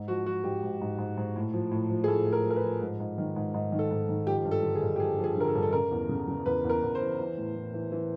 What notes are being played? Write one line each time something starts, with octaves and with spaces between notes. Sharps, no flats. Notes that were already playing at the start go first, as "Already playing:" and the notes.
Already playing: G#2
F3 F#4
F3 F#4
G#2 G4
G#2
G#2
G#2
G#2
A2
F3
A2
F3
G#4
A2 A4
A2
A#4
F3
A#4
B4
F3
G#2
G#2
D#3
G#2
G#2
D#3
A4
G#2
D#3
F3 G4
G2
A4
D3
G#4
G2
G4
F3 G#4
F3
G#4
D3 A#4
A4
G2
A4
C#3 A#4
E2
C#3
C#3
E2 B4
E2
A#4
E2
C5
E3
E3
A2
A2
E3
E3